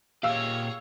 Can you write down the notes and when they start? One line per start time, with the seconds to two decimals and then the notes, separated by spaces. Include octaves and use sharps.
0.23 A#2 G4 G#4 C#5 F5 E6